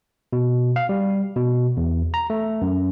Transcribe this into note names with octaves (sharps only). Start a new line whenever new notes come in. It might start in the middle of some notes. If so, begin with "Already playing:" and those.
B2
F5
G3
B2
E2
A#5
A3
F#2